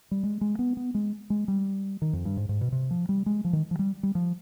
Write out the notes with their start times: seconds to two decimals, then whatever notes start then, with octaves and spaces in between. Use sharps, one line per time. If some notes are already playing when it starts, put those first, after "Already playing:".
0.11 G3
0.23 G#3
0.41 G#3
0.59 B3
0.77 B3
0.94 G#3
1.30 G#3
1.48 G3
2.02 D#3
2.13 F2
2.25 G2
2.37 G#2
2.49 G#2
2.61 B2
2.72 C3
2.91 F3
3.09 G3
3.26 G#3
3.44 F3
3.53 D#3
3.71 F3
3.79 G3
4.03 G3
4.15 F3